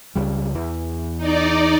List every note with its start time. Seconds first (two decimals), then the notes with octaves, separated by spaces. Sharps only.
0.16 C#2 C#3 G3
0.55 E2 E3
1.18 D#4 D5